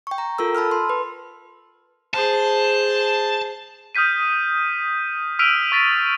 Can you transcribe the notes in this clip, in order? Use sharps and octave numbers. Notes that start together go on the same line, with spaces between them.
G5 C#6
A#5
F4 A4 A#4 E6
A5 B5 E6 F6
C6
B4
G#4 C5 A5
D#6 F6 G6 B6 D#7
E6 F6 B6 D7 D#7 F7
C#6 A6 B6